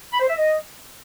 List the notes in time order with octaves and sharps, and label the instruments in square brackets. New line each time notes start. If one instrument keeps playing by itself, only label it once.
[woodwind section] B5
C5
E5
D#5